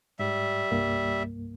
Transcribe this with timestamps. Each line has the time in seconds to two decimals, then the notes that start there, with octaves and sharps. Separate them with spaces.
0.19 G#2 G3 E5
0.71 C2 G2 A#3